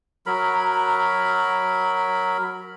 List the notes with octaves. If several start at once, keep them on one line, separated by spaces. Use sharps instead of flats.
F#3 A#4 B5